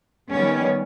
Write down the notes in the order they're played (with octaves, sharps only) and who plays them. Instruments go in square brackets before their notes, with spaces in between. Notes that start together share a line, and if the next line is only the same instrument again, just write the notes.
[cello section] D#3 G3 B3 C#4